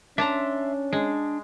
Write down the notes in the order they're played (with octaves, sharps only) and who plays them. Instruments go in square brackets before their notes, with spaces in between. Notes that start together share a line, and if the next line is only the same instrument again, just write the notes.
[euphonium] C#4 [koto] D4 A5 A#5 [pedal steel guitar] E5 C6
[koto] G#3 [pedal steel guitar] D4